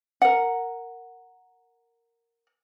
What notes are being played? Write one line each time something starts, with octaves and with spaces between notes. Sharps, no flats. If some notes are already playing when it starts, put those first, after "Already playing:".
A#4 F#5